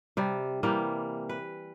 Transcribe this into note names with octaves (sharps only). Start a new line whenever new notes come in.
C3 G3
C3 E3 G3 A#3
B4